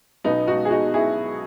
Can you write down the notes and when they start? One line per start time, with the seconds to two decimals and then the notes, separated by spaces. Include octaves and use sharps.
0.24 B1 B2 B3 D#4
0.48 D#4 F#4
0.65 G#4
0.71 D#4 F#4
0.94 E4 G#4